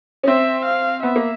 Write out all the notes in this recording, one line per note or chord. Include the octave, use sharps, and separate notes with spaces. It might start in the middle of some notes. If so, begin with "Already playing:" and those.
C#4
C4 E5
F5
B3 E5
A#3